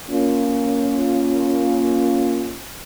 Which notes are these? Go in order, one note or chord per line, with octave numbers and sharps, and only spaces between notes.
A#3 C#4 F4